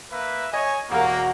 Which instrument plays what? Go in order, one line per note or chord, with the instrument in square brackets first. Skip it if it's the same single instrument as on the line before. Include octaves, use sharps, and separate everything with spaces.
[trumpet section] A#3 B4 E5
[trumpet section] C#5 G#5 [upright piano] D#5
[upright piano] E1 A#4 [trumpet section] A#3 [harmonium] F#4